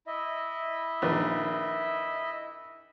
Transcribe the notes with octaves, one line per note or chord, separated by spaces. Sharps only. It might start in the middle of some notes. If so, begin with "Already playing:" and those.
E4 D#5 E5
A#1 D#3 B4